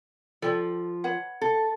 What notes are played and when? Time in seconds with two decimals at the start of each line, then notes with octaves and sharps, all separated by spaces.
0.42 F3 A4 D5 G5
1.04 B4 C#5 F#5
1.41 A4